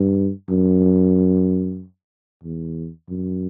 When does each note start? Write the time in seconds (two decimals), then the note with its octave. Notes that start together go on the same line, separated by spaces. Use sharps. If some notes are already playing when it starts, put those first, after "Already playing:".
Already playing: G2
0.49 F#2
2.44 E2
3.09 F#2